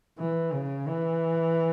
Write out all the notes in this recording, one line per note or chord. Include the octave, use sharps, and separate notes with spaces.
E3
C#3
E3